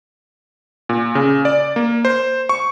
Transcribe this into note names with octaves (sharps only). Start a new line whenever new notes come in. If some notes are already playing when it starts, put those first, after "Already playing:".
A#2
C#3
D5
A#3
C5
C#6